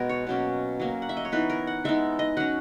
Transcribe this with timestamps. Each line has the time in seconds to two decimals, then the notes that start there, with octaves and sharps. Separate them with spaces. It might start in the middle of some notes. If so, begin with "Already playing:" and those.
Already playing: B2 G#3 B3 G#4 A#4
0.09 C#5
0.27 B2 F#3 A#3 C#4
0.80 F#3 A#3 C#4
1.02 F#5
1.09 E5
1.17 D#5
1.25 C#5
1.32 E3 B3 D#4 B4
1.50 A#4
1.67 F#5
1.84 E3 G#3 B3 D#4 E5
2.19 D#5
2.37 F#3 C#4 F#5